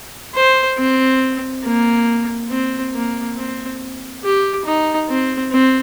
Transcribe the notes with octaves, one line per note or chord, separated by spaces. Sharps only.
C5
C4
A#3
C4
A#3
C4
G4
D#4
C4
C4